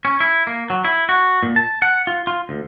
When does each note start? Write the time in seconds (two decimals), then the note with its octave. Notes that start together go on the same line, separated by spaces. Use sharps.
0.05 C#4
0.20 E4
0.47 A#3
0.70 F#3
0.85 E4
1.09 F#4
1.43 A#2
1.56 A5
1.82 F#5
2.07 F4
2.27 F4
2.49 D2